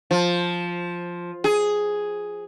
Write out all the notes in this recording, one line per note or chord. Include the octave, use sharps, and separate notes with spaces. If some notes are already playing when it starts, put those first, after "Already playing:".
F3
G#4